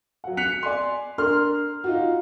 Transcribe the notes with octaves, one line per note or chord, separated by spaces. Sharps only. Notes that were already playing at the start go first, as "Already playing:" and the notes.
F#3 F#5
F#6 B6 C#7 F7
D5 G#5 C6
D4 A#4 C6 F6
D#4 F4 F#4